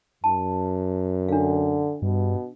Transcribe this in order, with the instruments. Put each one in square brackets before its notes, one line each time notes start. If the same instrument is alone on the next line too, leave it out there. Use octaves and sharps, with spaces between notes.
[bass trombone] F#2 [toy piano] A5
[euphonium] D3 [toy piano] D4 F5
[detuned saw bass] G2 [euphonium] B2